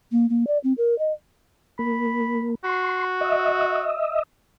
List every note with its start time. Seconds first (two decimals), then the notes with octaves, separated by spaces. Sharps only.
0.12 A#3
0.30 A#3
0.47 D5
0.64 C4
0.78 A#4
0.99 D#5
1.79 A#3 B5
2.64 F#4 C6
3.21 D#5 E5